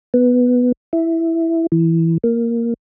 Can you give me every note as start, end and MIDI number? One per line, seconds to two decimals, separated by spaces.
0.14 0.72 59
0.93 1.66 64
1.72 2.18 52
2.24 2.74 58